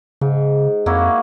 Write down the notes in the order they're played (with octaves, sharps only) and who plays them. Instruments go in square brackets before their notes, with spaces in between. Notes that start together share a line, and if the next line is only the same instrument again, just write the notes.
[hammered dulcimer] G#2 [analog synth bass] C#3
[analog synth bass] F2 [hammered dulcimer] A#3 E4 F#4